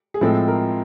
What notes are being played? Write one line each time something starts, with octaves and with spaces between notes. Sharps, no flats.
G#4
A2 F3 G#3 C4 A4
A#4